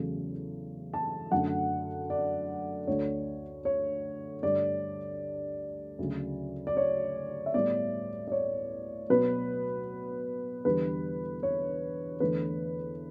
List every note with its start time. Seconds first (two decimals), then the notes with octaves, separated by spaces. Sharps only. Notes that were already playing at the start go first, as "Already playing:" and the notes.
Already playing: E2 C#3 F#3 A3
0.94 A5
1.32 F#2 D3 A3 F#5
2.10 D5
2.87 D2 D3 A3 C#5
3.65 C#5
4.43 G2 D3 A3 D5
5.99 D2 C#3 F#3
6.67 D5
6.77 C#5
7.46 E5
7.54 A2 G3 B3 D5
8.28 D5
8.32 C#5
9.10 B2 F#3 B3 B4
10.65 E2 D3 G3 B4
11.43 C#5
12.20 E2 D3 A3 B4